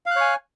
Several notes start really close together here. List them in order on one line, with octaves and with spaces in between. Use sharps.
F5 F#6 C#5 G#5